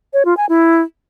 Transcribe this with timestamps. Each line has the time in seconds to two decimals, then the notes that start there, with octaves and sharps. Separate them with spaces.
0.13 C#5
0.25 F4
0.37 G#5
0.49 E4